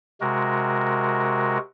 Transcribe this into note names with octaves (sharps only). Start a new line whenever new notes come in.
C3 G#3 F#4 A#4